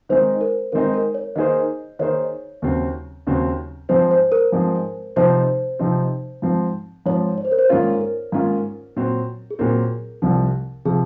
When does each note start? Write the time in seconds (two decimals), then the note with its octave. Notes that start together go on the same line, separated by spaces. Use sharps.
0.09 D#3 G#3 C4 D#4 C5
0.41 A#4
0.72 D#3 G#3 C4 D#4 A#4
0.94 A#4
1.14 C#5
1.36 D#3 A#3 D#4 G#4 C5 D#5
1.99 D#3 A#3 D#4 G#4 C5 C#5
2.62 D#2 C#3 F#3 C4
3.27 D#2 C#3 F#3 C4
3.89 G#2 F3 G#3 C4 C5
4.11 C5
4.32 A#4
4.52 G#2 F3 G#3 C4
5.16 C3 F3 C4 D#4 C5
5.79 C3 F3 C4 D#4
6.42 G#2 F3 C4
7.06 G#2 F3 C4 C#5
7.38 C#5
7.45 C5
7.52 A#4
7.59 C5
7.69 G#2 D#3 A#3 C#4 F4 C#5
8.01 A#4
8.32 G#2 D#3 A#3 C#4 F4
8.96 A#2 F#3 C4
9.50 G#4
9.59 A#2 F#3 C4 A#4
10.22 C2 C3 F3
10.85 C3 F3 G#4